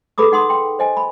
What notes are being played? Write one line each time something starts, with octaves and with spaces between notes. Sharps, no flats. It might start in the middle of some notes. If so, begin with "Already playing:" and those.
G#4 A4 B4 B5 D6 D#6
D#4 F#5 C6 D#6
G5 C6
C5 D#5 G#5
B5